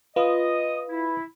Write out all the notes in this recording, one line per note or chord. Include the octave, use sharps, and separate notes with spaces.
F4 B4 D#5 D#6
E4